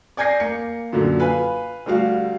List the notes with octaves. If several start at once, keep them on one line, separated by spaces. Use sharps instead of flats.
D5 G#5 G6 G#6 A#6 C7
A#3 C#7
F#2 A#2 D3
B4 F5 G#5 B5
D2 G3 F#4 F5